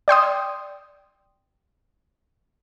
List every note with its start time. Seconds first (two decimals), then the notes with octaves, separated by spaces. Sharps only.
0.08 D5 G5 C6 D#6